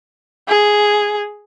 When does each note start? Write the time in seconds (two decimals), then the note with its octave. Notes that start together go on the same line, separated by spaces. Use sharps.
0.48 G#4